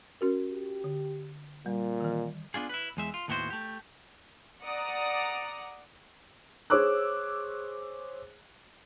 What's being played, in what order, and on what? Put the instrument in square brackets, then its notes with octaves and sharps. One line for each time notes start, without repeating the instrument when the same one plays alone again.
[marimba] C#4 F#4 A#4
[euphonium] G4
[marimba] D3
[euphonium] A#2 [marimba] G3
[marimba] D#3 E3
[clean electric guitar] B3 D4 F4 G#4
E4 B4
E2 G#3 E5
F4
D#2 A2 B3 E4 F#4 C5
A3 G4
[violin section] D5 F#5 A#5 D#6
[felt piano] G#4 C5 C#5 D6 E6 F#6